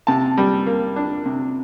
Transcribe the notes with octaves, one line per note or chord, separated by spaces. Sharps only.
C3 A5
G3
A#3
D4
C3